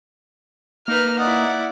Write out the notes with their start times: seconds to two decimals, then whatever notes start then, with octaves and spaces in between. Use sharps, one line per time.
0.88 A#3 D#4 B4 F6
1.19 D#4 E4 D5 F#5